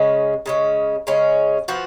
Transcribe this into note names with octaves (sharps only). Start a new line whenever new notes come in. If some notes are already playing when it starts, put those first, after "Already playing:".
Already playing: C#3 G#3 C#4
C#3 G#3 C#4
C#3 G#3 C#4
F3 B3 F#4